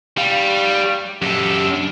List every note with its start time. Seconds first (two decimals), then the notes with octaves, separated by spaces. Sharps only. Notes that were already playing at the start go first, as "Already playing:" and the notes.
0.18 G3 G4 F5
1.22 F#2 G4 A4
1.74 D4